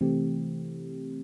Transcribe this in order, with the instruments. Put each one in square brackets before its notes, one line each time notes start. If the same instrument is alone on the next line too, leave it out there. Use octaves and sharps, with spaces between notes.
[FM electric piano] C3 E3 A3 C4 G4